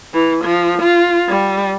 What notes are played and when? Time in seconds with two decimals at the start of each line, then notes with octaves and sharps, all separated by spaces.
0.13 E3
0.44 F3
0.82 F4
1.29 G3